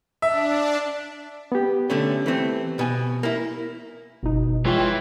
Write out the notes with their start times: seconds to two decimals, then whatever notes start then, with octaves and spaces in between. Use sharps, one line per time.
0.22 D4 E5
1.52 B3 G4
1.90 D3 A3 C#4
2.26 E3 A3 C4
2.79 B2 G#5
3.23 A#3 E4
4.23 G1 B2 D#4
4.65 E3 G#3 F4 C#5 G5 C6 C#6